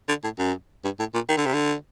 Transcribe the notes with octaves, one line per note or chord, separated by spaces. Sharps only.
D3
A2
F#2
G2
A2
A#2
D#3
D3
C3
D3